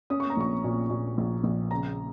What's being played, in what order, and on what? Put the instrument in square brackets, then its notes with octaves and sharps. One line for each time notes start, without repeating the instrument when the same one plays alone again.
[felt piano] C#4 D#6
C#6
A#5
A#1 C#6
A#2
A#2
A#1
A#1
C#3 A#5